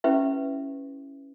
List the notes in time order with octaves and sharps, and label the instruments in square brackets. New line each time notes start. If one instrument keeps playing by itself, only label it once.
[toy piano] C#4 E4 G4 B4 E5